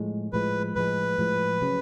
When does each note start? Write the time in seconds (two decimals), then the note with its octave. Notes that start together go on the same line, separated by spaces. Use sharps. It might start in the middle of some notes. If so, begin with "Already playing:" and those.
Already playing: A2 F3 G#3
0.33 A2 F3 G#3 B4
0.75 A2 F3 G#3 B4
1.18 A2 F3 G#3
1.61 C#3 F#3